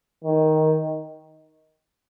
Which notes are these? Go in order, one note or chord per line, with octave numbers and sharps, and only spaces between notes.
D#3